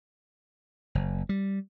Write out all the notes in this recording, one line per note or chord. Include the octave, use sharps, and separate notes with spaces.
F#1
G3